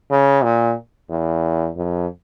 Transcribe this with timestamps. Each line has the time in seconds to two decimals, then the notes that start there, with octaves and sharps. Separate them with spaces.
0.10 C#3
0.43 A#2
1.10 E2
1.77 F2